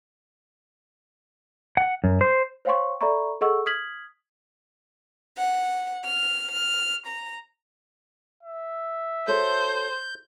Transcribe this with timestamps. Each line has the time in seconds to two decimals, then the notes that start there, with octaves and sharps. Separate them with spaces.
1.77 F#5
2.04 F#2
2.21 C5
2.65 C5 C#5 F5 G5 C6 C#6
3.01 A4 D5 E5 A#5 B5 C#6
3.41 G#4 A4 D#5 F#5 C#6 E6
3.66 D#6 F6 G#6 B6 F#7
5.37 F#5
6.03 F6
6.51 F6
7.06 A#5
8.43 E5
9.28 F#4 A4 C5 C#5 G6